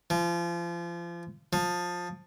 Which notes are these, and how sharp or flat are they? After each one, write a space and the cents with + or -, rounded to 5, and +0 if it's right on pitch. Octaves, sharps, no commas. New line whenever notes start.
F3 -30
F3 +20